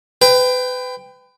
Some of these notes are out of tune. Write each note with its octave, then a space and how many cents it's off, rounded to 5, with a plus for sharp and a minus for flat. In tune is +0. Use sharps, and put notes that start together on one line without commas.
B4 +35 G5 +10